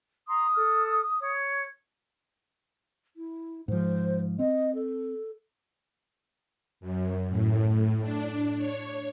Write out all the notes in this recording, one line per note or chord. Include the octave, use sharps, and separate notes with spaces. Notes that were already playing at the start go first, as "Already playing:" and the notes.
A#5 C6 D#6
A4 F6
C#5
E4
G#2 F3 C5
C4 D#5
A4
F#2
A2
D4
C#5